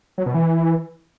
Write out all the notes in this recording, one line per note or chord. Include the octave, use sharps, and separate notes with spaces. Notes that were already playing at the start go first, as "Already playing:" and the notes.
F#3
B2
E3